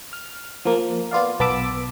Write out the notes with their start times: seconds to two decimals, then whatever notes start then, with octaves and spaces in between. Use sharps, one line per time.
0.13 F6
0.65 F3 A#3
1.11 B3 F4 D5 F5
1.40 B1 B3 A5 B5 D6 E6